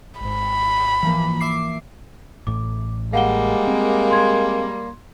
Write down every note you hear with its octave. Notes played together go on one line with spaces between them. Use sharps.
G#1 G#2 B5
E3 F3 A#3
E5 D6 C7
A1 A2 D6
G3 G#3 A#3 F5 F#5 G7
C4
C6 G#6